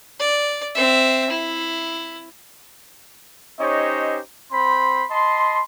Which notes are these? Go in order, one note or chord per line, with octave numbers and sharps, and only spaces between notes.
D5
C4 E5
E4
C#4 D#4 G4 C5 C#5 D#5
C4 C5 B5 C6
D#5 A5 B5 C6